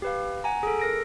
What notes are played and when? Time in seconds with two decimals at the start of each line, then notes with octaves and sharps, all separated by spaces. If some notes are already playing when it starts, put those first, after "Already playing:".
0.02 G4 B4 F5
0.44 F#5 G#5 A#5
0.63 G#4 A4
0.80 A#4 A#6 D7